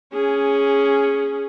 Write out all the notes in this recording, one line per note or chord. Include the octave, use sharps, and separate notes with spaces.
C#4 G#4